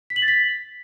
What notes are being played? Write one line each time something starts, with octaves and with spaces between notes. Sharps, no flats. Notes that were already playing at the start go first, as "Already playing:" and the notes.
B6
F#7
A6
B6